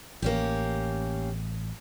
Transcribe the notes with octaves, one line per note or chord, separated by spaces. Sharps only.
A1 A#3 C#4 G4